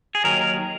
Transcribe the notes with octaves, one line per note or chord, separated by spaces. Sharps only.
G#4
D#2 D#3 F#3 A#4